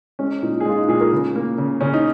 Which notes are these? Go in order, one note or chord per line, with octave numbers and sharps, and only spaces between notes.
G#3 C#4
A#2 D#4
G#4
G#3 F4
D#4
A#2 G#4
A#4
C#3
A#3
C#3
C#3 C#4
D#4